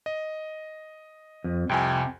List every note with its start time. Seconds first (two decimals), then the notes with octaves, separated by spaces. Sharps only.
0.06 D#5
1.44 F2
1.69 C2 F2 C3 G5 G#5